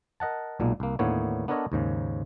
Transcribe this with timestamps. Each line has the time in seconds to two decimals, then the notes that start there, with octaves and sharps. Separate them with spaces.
0.20 A#4 D#5 F#5 A5
0.60 B1 A#2 G#3 A#3
0.80 C2 A#3
0.99 D#2 A2 D3 A#3 B3 C#5
1.48 B3 D4 A4 A#4 C#5 D#5
1.72 D#2 G#2 C#3